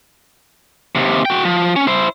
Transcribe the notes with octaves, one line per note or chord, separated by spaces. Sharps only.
D#2 C3
F#4 G5
F3
C#4
E4 C5